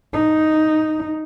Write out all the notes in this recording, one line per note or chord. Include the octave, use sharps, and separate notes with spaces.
D#4